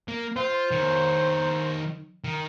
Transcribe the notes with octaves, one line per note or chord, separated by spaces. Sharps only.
A#3
F4 C5
D#3 C#5
D#3